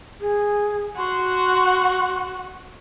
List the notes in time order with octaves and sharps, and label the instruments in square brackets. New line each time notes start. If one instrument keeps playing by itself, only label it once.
[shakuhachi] G#4
[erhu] F#4 [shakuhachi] C6